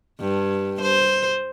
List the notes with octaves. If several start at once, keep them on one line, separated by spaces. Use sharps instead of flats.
G2
C5